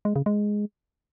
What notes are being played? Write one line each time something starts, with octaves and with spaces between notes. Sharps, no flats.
G#3
C#3
G#3